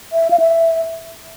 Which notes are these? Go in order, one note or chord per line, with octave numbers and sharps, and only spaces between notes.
E5
F5
E5